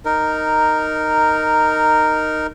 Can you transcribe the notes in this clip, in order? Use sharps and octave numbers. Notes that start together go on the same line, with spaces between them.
D#4 A#4